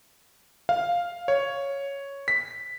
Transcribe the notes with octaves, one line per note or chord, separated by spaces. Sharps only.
F5
C#5
B6